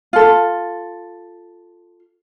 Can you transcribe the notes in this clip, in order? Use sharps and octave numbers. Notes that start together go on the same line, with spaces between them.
F4 A4